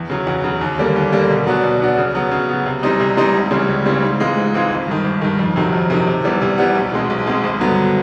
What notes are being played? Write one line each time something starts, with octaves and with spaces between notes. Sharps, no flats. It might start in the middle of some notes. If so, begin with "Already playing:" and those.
Already playing: E2
C#3 F#3
E2
C#3 F#3
D#2
D3 G3 A#3
D#2
D3 G3 A#3
B2
F#3 B3 D4 F#4
B2
F#3 B3 D4 F#4
C#3
F#3 B3
C#3
F#3 B3
C3
E3 G3 C4 D#4
C3
E3 G3 C4 D#4
C#2
C#3 E3 G3 C4
C#2
C#3 E3 G3 C4
G#2
E3 G#3 C4 F4
G#2
E3 G#3 C4 F4
G#1
G2 D#3
G#1
G2 D#3
F2
C3 D#3 F#3
F2
C3 D#3 F#3
C3
E3 G3 B3
C3
E3 G3 B3
B1
B2 G#3 C4
B1
B2 G#3 C4
G#1
G2 D3 F#3 B3